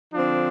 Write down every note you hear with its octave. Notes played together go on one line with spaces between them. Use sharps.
D3 F3 C4 D4